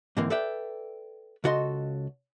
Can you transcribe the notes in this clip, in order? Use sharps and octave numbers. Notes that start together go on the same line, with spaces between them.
G#2 D3 E3 A#3 C4
A4 B4 D5 E5 G5
C#2 C#3 F#4 A4 D#5 C6